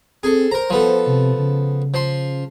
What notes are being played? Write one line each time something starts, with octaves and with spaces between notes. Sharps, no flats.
C4 G#4 A4
A#4 C5 A#5
F3 B3 A4
C3
C#3
F3 C6